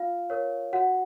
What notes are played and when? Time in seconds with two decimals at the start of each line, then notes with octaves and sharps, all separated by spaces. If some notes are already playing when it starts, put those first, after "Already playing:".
Already playing: F4 F5
0.30 A#4 C#5
0.73 F#4 F#5